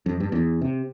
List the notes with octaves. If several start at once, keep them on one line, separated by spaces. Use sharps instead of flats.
F2
G2
E2
C3